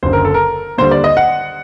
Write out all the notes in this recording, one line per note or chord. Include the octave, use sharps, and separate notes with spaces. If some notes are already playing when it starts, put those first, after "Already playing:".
F#1 F#2 D3 C5
A#4
A4
A#4
D#2 D3 G3 C5
D5
D#5
F#5